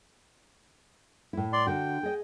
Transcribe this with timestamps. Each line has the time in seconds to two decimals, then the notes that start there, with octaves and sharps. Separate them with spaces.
1.33 A2 E4
1.53 D5 C6
1.67 D3 F#4 G5
2.03 G#4 D#5